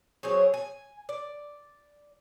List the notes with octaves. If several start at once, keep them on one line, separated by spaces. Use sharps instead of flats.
F#3 C4 G#4 C#5
G#5
D5